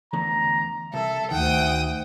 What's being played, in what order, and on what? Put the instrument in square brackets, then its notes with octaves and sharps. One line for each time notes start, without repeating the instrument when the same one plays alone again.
[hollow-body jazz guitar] E2 D3 A3 [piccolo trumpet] A#5
[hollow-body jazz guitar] C2 [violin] A4 [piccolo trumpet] E5
[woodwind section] D2 [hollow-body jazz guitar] D#3 [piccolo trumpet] F#5 [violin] G5 D#6